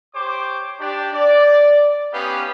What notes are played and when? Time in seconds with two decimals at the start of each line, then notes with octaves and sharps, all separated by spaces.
0.15 G4 C5 C#5 D6
0.80 D4 G4 D5
1.14 D5
2.13 B3 C#4 D#4 G4 B4 F5